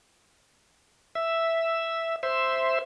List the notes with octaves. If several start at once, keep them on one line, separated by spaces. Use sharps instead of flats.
E5
C5 E5